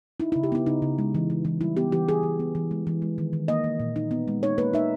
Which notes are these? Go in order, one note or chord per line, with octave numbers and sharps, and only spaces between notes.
D#4 E4
E4
C#3
G4
B3 E4
C#3 D#4
C#3
G#3
E3
E3
E3
G3 E4
B3 G4
E3 G4
E3 G#4
E3
B3
E3
G#3
E3
G#3
D#3
D#3
A#3 D#5
A#3
A#2
D#4
B3
G#3
D#4 C#5
A#3 B4
D#4 E5